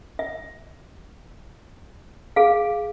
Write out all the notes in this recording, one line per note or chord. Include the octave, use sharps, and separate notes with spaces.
E5
G#4 F5